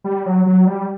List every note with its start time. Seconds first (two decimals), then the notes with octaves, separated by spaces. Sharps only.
0.04 G3
0.26 F#3
0.46 F#3
0.67 G3